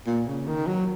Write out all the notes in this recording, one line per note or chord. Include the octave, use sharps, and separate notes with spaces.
A#2
C#3
D#3
F#3